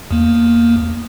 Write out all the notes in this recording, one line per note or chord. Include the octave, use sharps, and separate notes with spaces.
E2 A#3